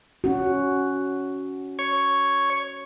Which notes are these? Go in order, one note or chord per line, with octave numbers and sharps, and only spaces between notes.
C#4 F#4
C#5 C#6